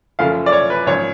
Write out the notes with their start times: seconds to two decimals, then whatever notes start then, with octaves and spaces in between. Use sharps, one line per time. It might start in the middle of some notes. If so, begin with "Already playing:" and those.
0.19 F#1 F#2 F3 A3 F5
0.46 D5
0.52 C#5
0.70 B4
0.86 G#1 F#2 F3 C#5